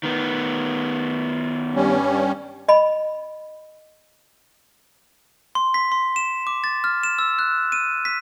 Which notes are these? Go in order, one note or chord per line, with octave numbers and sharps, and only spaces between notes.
D#3 B3
G2 G3 C#4
D#5 B5
C6
B6
C6
E7
D6
A6
F6
E7
E6
F#6
D#7
B6